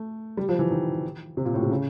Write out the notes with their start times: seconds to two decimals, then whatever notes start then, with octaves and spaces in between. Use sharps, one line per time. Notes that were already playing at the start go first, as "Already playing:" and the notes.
Already playing: A3
0.37 G3
0.49 F3
0.59 E3
0.71 D#3
1.37 C3
1.45 A#2
1.54 A2
1.62 C3
1.71 C#3